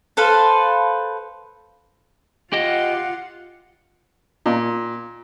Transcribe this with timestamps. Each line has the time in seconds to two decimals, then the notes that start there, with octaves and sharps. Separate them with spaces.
0.17 A4 B4 C5 F5
2.53 F4 G4 D#5 F#5
4.46 A#2